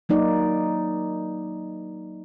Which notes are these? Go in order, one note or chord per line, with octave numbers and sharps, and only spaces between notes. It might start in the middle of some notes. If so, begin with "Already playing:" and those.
F#3 A#3 D#4 D5